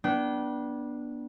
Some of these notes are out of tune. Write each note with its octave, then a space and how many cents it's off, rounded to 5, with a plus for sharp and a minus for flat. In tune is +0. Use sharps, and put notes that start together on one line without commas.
B3 -30 D4 +0 G5 -35